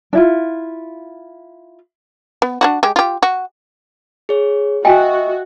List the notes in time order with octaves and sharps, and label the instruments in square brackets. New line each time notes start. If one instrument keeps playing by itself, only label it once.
[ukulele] D4 E4 F4
[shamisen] B3
D4 E4 F#4
G#3 G4
F4 G4
F#4
[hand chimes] G#4 C#5
[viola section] F#4 [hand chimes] D#5 E5 [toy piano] G5 G#5